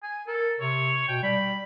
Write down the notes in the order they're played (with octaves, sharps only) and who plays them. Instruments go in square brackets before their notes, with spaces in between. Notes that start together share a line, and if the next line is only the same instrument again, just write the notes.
[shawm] G#5
[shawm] A4 [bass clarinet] A#4
[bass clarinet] C3 [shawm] C#5
[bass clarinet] B2 [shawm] G5
[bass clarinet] G3 [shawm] B5